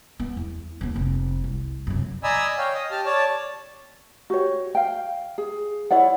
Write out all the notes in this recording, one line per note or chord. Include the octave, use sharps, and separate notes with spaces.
B3
E2
D#2 B3
F1
C2
F1 F#2
D5 D#5 G#5 A#5 B5 E6
C#5 F5 G5
D#5
G4 A5 F6
C#5 D5 A5
F#4 G4 C#5
F5 G5
G#4
E4 C#5 D5 F#5